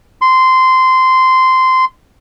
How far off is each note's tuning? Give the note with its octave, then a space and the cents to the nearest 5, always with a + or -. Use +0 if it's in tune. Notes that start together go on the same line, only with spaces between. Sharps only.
C6 -15